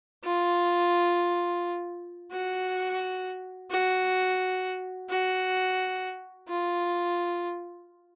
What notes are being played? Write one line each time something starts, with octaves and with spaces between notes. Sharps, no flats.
F4
F#4
F#4
F#4
F4